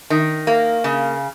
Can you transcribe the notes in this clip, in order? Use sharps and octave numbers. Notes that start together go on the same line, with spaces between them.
D#3
A#3
C#3